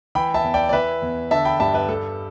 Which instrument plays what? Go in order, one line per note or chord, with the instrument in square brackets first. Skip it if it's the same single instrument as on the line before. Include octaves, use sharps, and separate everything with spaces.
[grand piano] E3 G5 B5
E5 A5
E2
D5 G5
D5
E3 B4 E5
E2
D3 E5 A5
G5 B5
G2 E5 A5
B4 E5
G3 A4